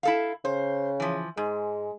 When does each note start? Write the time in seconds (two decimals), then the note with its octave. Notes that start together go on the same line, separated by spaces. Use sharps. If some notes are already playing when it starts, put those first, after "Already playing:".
0.03 E4 A4 F5
0.45 C#3 C5
1.00 E3 F3
1.37 G#2 G#3